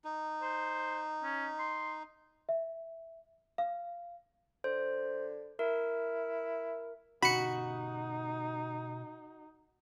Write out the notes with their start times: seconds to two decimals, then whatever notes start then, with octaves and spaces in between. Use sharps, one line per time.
0.05 D#4
0.42 C5
1.24 C#4
1.59 C6
2.49 E5
3.58 F5
4.64 D3 C5
5.59 E4 A#4
7.22 B2 D3 C#4 D#4 F#4 B5 C#7